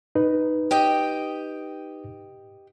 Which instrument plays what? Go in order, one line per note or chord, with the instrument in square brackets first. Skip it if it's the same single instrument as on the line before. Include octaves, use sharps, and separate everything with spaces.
[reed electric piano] D#4 B4
[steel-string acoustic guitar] G4 D#5 G5